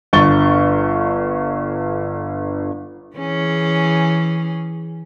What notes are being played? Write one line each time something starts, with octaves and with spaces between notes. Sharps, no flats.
G1 D3 C#6 A6 G7
E3 C#4 G#4